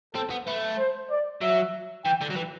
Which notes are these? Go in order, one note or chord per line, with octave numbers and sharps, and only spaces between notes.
C4 A4
B3
A3 B4
C5
D5
F#3 E5
E3 G5
D3
F#3
E3